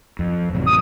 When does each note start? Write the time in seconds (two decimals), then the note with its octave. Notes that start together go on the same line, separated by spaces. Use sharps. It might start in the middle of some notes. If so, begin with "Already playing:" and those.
0.19 F2
0.53 A1 C3 F#3
0.66 D#6